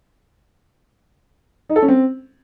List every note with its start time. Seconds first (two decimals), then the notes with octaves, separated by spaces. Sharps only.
1.69 D#4
1.76 A4
1.82 C#4
1.88 C4